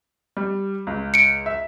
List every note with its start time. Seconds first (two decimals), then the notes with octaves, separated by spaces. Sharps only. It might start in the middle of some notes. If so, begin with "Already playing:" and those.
0.37 G3
0.87 C#2
1.14 C#7 D7
1.46 E5